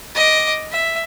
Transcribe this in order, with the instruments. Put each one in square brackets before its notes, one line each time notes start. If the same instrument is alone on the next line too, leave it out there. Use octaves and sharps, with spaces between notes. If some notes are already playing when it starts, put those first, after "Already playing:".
[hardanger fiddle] D#5 D6
E5